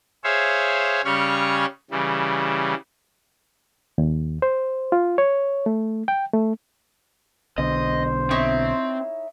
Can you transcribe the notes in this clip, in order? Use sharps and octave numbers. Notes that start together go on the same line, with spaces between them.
G#4 C5 C#5 E5 F5
C#3 G3 C#4 C#5 C#6 F6
C#3 E3 G3
D#2
C5
F4
C#5
A3
G5
A3
B1 B2 D3 C5 D#5
C4 D#4 E4 C#5